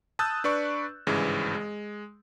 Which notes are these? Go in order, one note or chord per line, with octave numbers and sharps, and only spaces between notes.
A5 D#6 E6 F#6 G6 A6
D4 B4 D5 C#6
G#1 G2 C#3 E3 G#3
G#3